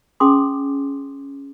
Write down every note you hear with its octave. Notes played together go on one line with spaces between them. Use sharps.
C#4 G#4 G#5 C6 D6 D#6